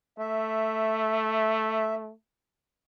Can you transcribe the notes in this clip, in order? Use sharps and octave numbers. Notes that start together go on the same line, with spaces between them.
A3 E5